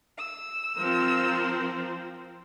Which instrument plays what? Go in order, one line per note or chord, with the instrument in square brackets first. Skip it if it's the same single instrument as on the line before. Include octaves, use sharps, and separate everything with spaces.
[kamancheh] E6
[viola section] F3 C4 [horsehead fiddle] A#4 C5